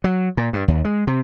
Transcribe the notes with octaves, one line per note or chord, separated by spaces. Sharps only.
F#3
A#2
G2
D#2
G#3
C3